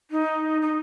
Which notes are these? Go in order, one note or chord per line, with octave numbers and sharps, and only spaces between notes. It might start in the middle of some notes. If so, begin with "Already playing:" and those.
D#4
D#4